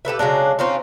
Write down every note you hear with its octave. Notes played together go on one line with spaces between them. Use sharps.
G4 A4 B4 E5
C#3 F#3 G#3 D4
C4 C#4 D#4 F4